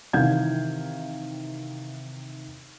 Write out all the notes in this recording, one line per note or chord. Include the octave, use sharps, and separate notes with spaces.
C3 D#3 E3 F5 G6 G#6